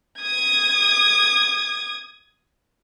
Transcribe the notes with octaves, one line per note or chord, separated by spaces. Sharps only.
D#6 G#6